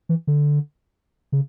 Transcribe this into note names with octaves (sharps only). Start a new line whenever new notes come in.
E3
D3
C#3